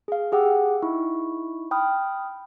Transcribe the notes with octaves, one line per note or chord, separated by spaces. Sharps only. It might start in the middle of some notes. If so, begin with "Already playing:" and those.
G#4 F5
G4 G#4 F#5 G5 D6 E6
D#4 E4 C#6
G5 B5 D#6 F6